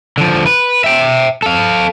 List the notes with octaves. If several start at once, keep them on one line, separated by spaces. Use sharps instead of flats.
D3 F3
B4
E5 G5
A4 F5